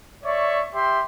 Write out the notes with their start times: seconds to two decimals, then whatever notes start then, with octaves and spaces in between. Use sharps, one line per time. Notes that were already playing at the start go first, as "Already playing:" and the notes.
0.23 C#5 D5 E5 C#6
0.73 G4 E5 G5 C6